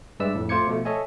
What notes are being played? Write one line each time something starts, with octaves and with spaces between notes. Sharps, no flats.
G2 G#3 B4 D5 E5 E6
F2 A2
A3 F4 C5 D6 G#6 C#7
B2 F3 A3
A4 C#5 D#5 E5 G#5